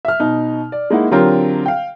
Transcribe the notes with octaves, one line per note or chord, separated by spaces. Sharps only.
E5 F6
B2 D#4
D5
G#3 A#3 D#4 E4 F#5
D3 F#3 C4 F4 G4 A#4
F5 G5